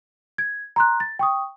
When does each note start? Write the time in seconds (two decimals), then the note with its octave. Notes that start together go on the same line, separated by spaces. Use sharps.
0.38 G#6
0.76 A#5 C6 F#6
1.00 A6
1.19 G5 C#6 D#6